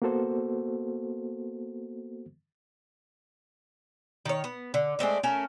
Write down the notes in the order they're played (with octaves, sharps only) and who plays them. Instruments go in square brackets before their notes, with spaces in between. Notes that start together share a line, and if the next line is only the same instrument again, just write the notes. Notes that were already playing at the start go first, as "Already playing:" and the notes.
[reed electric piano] A#3 B3 F#4 A4 C5
[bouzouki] D#3 C#5
B3
D3
G#3 A3 C4 D4
A3 C#4 A#4 A5